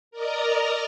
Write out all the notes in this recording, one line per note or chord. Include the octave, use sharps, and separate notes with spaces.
A#4 D5 D#5 A#5